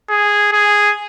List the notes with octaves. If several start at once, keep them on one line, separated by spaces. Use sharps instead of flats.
G#4
G#4